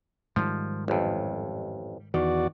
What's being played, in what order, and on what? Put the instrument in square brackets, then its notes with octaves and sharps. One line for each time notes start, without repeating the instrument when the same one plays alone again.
[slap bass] G#2 D#3 G3 [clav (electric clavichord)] F3
[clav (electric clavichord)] A1 F2
[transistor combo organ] E2 F#4 D5 [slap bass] D#3